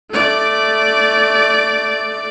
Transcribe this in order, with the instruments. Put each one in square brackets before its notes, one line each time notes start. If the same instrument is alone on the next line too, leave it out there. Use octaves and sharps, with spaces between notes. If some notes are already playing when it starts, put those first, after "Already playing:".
[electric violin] A3 D5